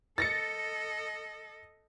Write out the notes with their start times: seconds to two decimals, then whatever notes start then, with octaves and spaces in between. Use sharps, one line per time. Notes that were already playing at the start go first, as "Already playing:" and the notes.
0.18 A4 D#5 A6 A#6 C#7